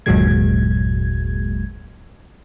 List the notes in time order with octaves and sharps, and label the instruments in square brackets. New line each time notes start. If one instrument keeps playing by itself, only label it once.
[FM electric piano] G1 D#2 A#2 F#3 G#3 G#6